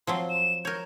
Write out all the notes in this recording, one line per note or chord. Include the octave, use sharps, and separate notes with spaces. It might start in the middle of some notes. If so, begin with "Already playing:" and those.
F3 F#3 C4 C6
E7
A#4 C#5 G6